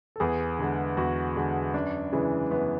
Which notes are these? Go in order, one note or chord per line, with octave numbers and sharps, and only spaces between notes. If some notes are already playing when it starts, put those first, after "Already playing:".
A4
E2 G#4
D3 G#3
E2 F#4
D3 G#3
F#2 D4
C#3 E3 G#3
F#2 B3